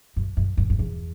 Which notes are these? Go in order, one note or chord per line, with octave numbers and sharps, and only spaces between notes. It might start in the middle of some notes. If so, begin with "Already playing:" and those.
F#2
F#2
F#2
F#2
E2